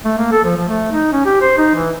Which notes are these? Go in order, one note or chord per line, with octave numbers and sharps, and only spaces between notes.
A3
A#3
A4
F3
F3
A3
D#4
C#4
G4
C5
D#4
E3